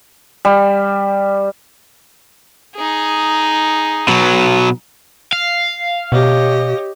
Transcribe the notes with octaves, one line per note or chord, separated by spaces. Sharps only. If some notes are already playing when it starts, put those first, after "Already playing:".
G3
D#4 G#4
B2 F#3
F5
B2 G4 C#5 D#5